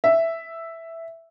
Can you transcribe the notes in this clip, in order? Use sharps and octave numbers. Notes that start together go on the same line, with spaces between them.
E5